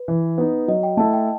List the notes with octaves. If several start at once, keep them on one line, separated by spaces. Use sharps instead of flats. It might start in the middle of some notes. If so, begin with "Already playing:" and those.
Already playing: B4
E3
B3 D#4
F#3 D#5
G5
A3 E4 A4 A5
G5